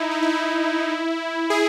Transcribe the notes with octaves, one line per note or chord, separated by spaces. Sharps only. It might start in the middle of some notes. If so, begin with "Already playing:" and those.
Already playing: D#4 E4
D#4
E4
G#4